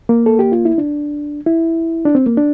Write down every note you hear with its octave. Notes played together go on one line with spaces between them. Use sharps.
A#3
A4
G4
F4
E4
D4
E4
D4
C4
A#3
D4